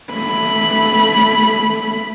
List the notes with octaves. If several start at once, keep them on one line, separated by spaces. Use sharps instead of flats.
A3 B5